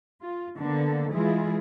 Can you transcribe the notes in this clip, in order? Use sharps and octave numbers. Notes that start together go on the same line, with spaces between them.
F4
D3 A#3 B3 D4 A4
E3 G#3 E4 F4 G#4